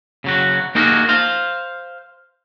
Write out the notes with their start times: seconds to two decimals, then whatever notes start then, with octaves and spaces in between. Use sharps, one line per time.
0.24 C#3 F#3 F#4
0.75 A#3 D#4 F#4 G#4 A#4
1.09 C5 F5